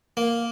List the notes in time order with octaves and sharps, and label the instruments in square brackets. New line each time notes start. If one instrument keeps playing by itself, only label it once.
[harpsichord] A#3